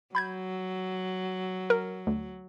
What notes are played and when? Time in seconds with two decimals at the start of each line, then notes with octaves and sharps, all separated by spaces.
0.15 F#3 B5 G6 G#6
1.70 A#4
2.07 D2